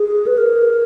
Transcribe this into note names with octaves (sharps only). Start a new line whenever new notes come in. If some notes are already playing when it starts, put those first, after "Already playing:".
Already playing: G#4
B4
A#4